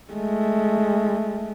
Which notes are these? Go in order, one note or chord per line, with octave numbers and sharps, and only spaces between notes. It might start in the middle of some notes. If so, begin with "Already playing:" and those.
G#3 A3